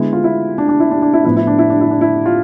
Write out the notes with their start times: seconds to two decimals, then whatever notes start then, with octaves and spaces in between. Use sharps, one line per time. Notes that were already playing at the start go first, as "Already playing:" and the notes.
Already playing: D3 G#3 B3 E4
0.13 F4
0.24 E4
0.58 D4
0.69 D4
0.80 E4
0.91 D4
1.02 D4
1.13 E4
1.25 A2 F3 B3 E4
1.36 E4
1.47 D4
1.59 E4
1.70 D4
1.81 E4
1.91 D4
2.01 E4
2.26 F4